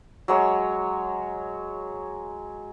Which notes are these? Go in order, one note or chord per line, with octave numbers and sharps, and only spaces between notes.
F#3 G#3 C#5